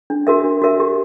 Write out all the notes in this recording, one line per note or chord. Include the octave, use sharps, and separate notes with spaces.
D4
F#4 A#4 E5
D4
F#4 A#4 E5
G4